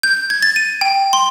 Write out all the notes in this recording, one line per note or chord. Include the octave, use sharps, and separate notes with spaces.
G6
G#6
A6
D#7
G5
C6